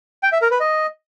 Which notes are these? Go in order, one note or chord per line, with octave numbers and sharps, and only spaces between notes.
G5
E5
A#4
B4
D#5